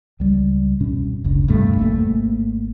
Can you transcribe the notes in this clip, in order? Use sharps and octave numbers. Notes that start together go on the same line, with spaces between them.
C#2 G3
F#2 B2 C#4
F#1 C#2 D3
E2 G2 C3 A3
G#1 A3 A#3